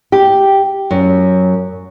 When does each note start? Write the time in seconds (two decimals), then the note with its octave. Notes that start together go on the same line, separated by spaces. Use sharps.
0.12 G4
0.91 F#2